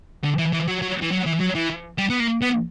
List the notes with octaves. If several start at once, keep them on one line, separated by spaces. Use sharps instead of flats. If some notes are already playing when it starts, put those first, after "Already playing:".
D3
E3
E3
F#3
F#3
E3
F#3
E3
F#3
E3
G3
B3
A#3
B3